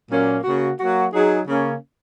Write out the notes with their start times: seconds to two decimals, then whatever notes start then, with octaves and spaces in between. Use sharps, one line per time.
0.11 A#2 F#3 A#3 C#4
0.44 C#3 A#3 F#4
0.79 F#3 A#3 F#4
1.14 F#3 D#4 G#4
1.48 C#3 A#3 C#4